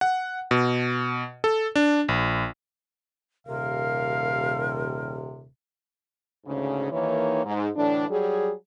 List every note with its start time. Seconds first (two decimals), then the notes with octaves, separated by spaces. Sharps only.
0.01 F#5
0.51 B2
1.44 A4
1.76 D4
2.09 A#1
3.47 D#1 C3 A#4 F5
6.45 D2 G#2 C#3
6.92 D#2 D#3 E3 A#3 C#5
7.44 G#2
7.76 A2 D3 E3 D4
8.09 F#3 G3 G#4